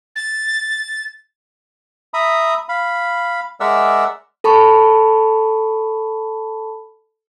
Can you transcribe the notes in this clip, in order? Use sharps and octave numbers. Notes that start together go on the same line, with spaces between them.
A6
E5 A#5 B5 D#6
F5 B5
G#3 A#4 D5 E5 F#5 E6
A4 A5 B5 C#6